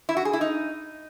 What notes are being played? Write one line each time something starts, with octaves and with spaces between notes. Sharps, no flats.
E4
F#4
G#4
E4
D#4